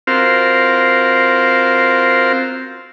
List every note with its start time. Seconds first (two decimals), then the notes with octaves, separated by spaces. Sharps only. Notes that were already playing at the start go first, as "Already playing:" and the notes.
0.07 C4 F4 F#4 A#4 C5 F5